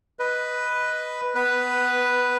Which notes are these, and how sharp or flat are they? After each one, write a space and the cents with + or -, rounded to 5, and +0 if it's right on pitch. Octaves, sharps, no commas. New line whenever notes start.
B4 +0 D#5 +0
B3 +15 B4 +0